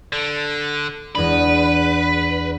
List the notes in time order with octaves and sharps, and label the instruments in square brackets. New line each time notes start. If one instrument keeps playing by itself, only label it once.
[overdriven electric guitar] D3
[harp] E2 G#3 D4 [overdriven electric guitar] B4